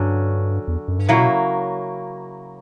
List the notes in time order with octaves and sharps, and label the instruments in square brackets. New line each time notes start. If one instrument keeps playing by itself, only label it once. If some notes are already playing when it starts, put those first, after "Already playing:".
Already playing: [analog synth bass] G2 [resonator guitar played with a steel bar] D3 F#3 C#4
[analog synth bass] E2
F#2
G2
[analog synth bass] A#2 [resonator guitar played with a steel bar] C#3 F#3 A#3 E4
[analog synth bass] B2